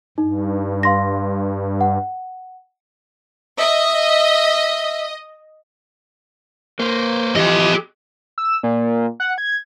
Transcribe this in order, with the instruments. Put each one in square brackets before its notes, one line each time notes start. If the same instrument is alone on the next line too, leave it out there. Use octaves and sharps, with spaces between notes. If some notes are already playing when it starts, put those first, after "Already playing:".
[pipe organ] G2 [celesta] D#4
[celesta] F5 C6 A#6
F#5
[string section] D#5 [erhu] E5
[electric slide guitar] A#3 [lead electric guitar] B4 C5
[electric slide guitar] E3 F3 [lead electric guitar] G4 [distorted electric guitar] A4 D#5
[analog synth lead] E6
A#2
F#5
G#6